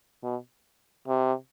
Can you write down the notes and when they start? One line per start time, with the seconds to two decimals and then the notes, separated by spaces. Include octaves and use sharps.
0.23 B2
1.08 C3